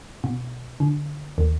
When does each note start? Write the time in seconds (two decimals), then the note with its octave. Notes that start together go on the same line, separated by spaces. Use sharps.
0.24 B2
0.80 D3
1.38 D#2